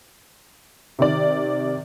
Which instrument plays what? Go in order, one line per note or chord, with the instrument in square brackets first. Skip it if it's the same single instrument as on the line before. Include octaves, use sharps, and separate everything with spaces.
[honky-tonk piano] C3 D#3 D5